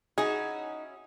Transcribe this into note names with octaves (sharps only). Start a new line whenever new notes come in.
C#4 D#4 E4 F#4 G#4